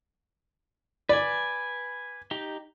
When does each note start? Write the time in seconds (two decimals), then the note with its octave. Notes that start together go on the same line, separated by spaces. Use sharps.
1.09 B4 D5 G#5
2.31 D#4 G4